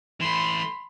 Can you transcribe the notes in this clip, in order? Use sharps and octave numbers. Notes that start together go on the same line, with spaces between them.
E3 A3 B5 C6